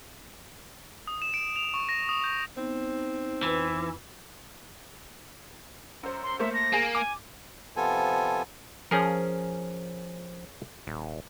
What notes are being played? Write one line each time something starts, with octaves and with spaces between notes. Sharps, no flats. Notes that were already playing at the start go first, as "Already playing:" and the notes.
D#6
E7
D7
F7
C#6
A#6
D#6
G6
B3 C4 D#4
F2 E3 B4
F#2 C5
C6
A3 A#3 C5 E5
A#6
A#3 G#4 G#5
G#5 D6
C3 F3 B3 F4 A4 G#5
F3 C#4 G#4 A#4
D#1